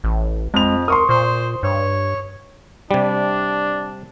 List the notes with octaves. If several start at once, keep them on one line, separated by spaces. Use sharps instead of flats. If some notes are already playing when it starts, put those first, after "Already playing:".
A1
F2 G#3 F7
A#4 C6 C#6 D#6
A#2 C5
G2 C#5
C3 G3 D4